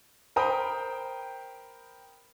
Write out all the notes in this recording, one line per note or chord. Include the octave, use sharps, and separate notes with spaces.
A#4 C5 G5 B5 D#6